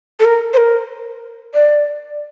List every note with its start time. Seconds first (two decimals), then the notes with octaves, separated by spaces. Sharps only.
0.20 A4
0.25 A#4
0.53 C5
0.57 A#4
1.54 D5